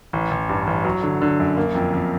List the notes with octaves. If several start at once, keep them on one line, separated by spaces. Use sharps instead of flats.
A1
A1
G2
A1
F#3
D3
D3
F#2
A#3
F2
F2